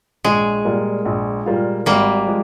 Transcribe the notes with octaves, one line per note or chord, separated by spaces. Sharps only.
A#1 G#3
A#2 G3 A#3 F4
A#1
A#2 G3 A#3 F4
G#1 G3 A#3
F3 G#3